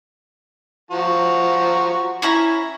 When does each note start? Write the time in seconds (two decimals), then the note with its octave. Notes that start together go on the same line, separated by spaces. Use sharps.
0.91 F3 F#4 A#5
2.22 C#4 E4 A#5